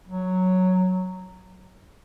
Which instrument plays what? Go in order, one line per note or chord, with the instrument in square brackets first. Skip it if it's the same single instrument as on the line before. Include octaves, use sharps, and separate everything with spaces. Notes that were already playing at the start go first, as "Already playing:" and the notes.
[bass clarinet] F#3